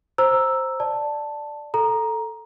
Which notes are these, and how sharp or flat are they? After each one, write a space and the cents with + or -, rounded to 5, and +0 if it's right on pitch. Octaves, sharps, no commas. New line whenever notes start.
C5 +5 A#5 +0 E6 +0
D5 +5 A5 +5
A4 +0 A#5 +10